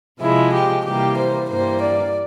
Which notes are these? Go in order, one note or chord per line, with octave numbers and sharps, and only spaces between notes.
C3 F3 G#3 E4
G4
C3 E3 G3 A#3 G4
C5
G2 E3 G3 A#3 C5
D5